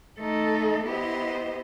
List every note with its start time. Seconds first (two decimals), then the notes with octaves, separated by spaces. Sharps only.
0.19 A3 D#4 A4
0.85 B3 E4 G4 C5 D#5